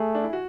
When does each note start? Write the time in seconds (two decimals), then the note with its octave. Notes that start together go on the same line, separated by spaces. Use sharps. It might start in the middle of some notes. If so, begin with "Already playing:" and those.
Already playing: A3 G#4
0.15 D4
0.24 E4
0.33 F#4